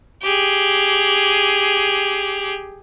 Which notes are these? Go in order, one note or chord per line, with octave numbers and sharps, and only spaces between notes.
G4 G#4